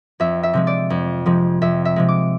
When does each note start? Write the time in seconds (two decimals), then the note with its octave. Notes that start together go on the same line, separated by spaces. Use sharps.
0.20 F2 E5
0.43 E5
0.53 C3 F3 G#3
0.67 D5
0.90 F2
1.26 C3 F3 G#3
1.61 F2 E5
1.85 E5
1.96 C3 F3 G#3
2.08 D6